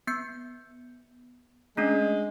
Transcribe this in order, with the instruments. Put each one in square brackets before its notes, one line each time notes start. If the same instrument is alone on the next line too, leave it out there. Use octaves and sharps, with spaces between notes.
[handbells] B3 G6 C#7
[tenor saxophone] G#3 [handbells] A3 C#4 D4